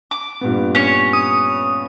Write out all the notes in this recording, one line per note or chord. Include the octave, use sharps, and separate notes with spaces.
D6
G2 A#2 B3
C#4 C#5
D#6